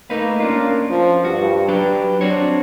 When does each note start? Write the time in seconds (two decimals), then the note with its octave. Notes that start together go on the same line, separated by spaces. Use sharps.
0.10 A3 A#3 D#4 B4
0.40 C#4 D4 F4
0.90 F3
1.25 G2 F#4
1.68 F#3 D4 G4 B4
2.21 C4 D4 F#4 C#5